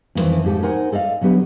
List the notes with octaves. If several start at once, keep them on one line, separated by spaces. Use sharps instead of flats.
F2 A2 D#3 E3 C5
F2 G#2 G4 A4
D#4 A#4 C5 F#5 G#5
A4 D5 D#5 F5
D3 F#3 B3 G4